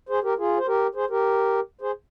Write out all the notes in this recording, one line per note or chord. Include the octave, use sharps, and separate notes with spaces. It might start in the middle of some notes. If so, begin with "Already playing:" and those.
G#4 C5
G4 A#4
F4 G#4
C5
G4 A#4
G#4 C5
G4 A#4
G#4 C5